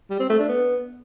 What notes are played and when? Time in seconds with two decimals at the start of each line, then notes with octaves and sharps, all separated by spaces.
0.10 G3
0.20 C4
0.29 A3
0.39 D4
0.49 B3